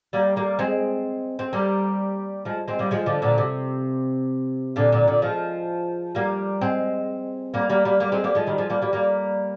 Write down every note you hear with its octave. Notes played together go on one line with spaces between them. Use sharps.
G3 A#3
G3 A#3
G#3 C4
C4
G3 A#3
F3 G#3
G#3 C4
G3 A#3
F3 G#3
D3 F3
A#2 D3
C3
A#2 D3
A#2 D3
A#2 D3
F3 G#3
G3 A#3
G#3 C4
G3 A#3
G3 A#3
G3 A#3
G3 A#3
G#3 C4
G3 A#3
F3 G#3
D#3 G3
F3 G#3
G3 A#3
G3 A#3
G3 A#3